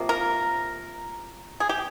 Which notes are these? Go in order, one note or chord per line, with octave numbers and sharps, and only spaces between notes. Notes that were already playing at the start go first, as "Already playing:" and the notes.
Already playing: C3 F3 A#3
A#4
G#4
G4